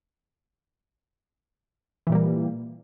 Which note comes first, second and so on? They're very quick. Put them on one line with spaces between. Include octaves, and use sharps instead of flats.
E3 A#2 G3 A#3